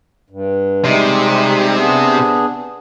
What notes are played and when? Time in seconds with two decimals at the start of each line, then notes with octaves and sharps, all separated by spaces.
0.30 G2
0.85 C3 G3 G#3 D#4
1.78 B3 D4 G#4